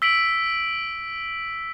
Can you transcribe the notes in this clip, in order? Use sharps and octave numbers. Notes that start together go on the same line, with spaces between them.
E6 B6 D7 F#7